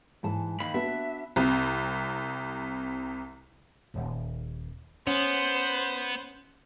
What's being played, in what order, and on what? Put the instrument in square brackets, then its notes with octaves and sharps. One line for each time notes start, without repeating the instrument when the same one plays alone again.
[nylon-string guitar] G#2 E3 A5
[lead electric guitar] D#2 B5
[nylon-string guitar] B3 D4 F#4 [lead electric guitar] E5
[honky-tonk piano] C2 C3
[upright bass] D#1 D#2
[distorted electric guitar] B3 [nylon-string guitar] C#4 [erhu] C5